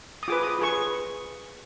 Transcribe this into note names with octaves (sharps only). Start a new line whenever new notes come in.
D#6
F4 G#4 B4 D6
D#6
F4 G#4 B4 C#6